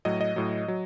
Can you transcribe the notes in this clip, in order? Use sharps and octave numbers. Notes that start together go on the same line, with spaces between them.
A2 F#3 D#5
D#5
A2 F#3
F#3